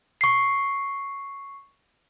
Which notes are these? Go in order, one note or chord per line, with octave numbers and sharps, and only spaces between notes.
C#6 C7